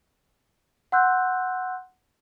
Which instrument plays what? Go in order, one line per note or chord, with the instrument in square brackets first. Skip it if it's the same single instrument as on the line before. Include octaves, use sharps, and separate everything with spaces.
[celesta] F#5 C6 E6 F#6 G6